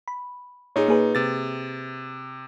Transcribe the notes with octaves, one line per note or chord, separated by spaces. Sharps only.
B5
A#2 D#4 G#4 C#5
A#3 G#4 B4
C3 A6